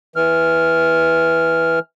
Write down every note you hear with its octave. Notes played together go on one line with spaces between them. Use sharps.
E3 F6